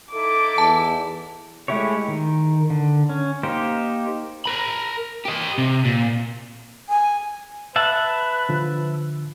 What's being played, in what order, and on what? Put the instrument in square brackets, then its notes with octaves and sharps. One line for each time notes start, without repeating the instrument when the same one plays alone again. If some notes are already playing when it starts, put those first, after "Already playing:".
[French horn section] D#4 E4 A4 [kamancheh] D6
[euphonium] E2 [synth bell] A5
[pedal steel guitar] G#3 A3 E4 G4 C#5
D#3
D3
C#4
A#3 D#4 G4 C5
[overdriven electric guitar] A#4 B5
G4 D#5
C3
A#2
[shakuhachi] G#5
[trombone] B4 [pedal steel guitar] E5 F#5 A5
[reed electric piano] D3 F3